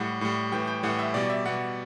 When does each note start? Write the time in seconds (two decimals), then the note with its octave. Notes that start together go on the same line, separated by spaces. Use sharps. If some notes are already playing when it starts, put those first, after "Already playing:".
Already playing: A2 G3 F#5
0.21 A2 G3
0.52 A2 E3 G3 G5
0.67 G5
0.83 A2 E3 G3 F#5
0.99 E5
1.14 B2 G3 D5
1.30 E5
1.46 B2 G3 F#5